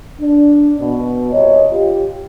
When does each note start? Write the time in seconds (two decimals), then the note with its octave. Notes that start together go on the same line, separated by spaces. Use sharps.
0.21 D4
0.80 B2
1.33 C2 C#5 D#5
1.72 F4 G4